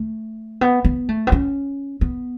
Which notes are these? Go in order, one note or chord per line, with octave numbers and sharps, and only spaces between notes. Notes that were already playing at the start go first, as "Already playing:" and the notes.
Already playing: A3
B3
B3
A3
B3
C#4
B3